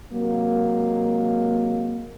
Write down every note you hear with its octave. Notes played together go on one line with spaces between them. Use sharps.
C3 F#3 G#3 A#3